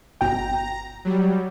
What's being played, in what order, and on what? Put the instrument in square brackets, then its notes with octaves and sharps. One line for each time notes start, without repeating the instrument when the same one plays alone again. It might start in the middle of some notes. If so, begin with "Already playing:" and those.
[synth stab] G1 B2 G5 [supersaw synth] A#5
[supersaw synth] F#3 G3